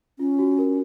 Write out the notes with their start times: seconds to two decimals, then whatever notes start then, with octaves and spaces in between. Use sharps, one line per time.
0.19 C#4 F4
0.39 F#4
0.58 A#4